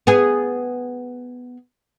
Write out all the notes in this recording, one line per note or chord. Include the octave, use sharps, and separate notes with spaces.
B3 G#4